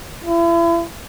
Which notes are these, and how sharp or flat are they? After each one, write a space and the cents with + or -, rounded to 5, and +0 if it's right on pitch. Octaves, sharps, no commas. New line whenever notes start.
E4 +40